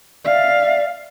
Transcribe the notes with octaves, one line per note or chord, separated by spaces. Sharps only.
D5 E5 F5